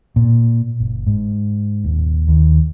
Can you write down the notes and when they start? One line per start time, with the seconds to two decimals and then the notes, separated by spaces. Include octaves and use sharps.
0.16 A#2
0.80 F#1
1.07 G#2
1.84 D#1
2.28 D#2